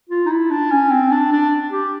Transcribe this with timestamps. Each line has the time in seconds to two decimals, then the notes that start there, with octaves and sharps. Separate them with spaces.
0.09 F4
0.26 D#4
0.29 E4
0.51 D4
0.71 C#4
0.91 C4
1.12 D4
1.32 D4
1.72 G4